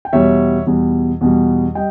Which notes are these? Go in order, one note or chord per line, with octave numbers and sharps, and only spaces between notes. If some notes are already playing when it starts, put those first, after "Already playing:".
G5
E2 B2 G3 C#5 E5
E2 B2 G3
E2 B2 G3
G3 D#5 G5